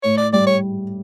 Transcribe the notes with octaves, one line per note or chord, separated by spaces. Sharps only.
A2 C#5
D5
G3 D5
C#5